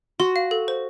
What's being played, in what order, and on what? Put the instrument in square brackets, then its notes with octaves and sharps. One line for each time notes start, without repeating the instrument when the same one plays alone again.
[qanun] F#4 [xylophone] C6
[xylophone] F5
A4
C5